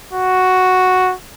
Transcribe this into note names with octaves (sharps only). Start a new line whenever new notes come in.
F#4